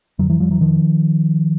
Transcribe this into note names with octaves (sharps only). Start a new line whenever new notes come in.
F2 D3 E3 F#3
E3 F#3
F3 G3
E3 F#3
D#3 F3